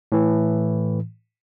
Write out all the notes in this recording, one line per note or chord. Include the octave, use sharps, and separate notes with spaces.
A2 E3